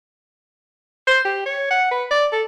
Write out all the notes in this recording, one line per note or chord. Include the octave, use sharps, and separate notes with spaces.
C5
G4
C#5
F#5
B4
D5
A4